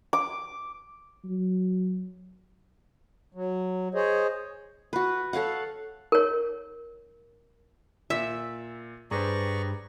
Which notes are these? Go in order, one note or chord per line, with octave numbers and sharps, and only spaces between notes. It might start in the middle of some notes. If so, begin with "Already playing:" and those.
D6
F#3
F#3
G#4 C5 C#5 D#5
F#4 B4
A4 C#5 F5 F#5
A#4 C#5
A#2 E5
G2 G#4 B4 C5 D5 A#5 C#6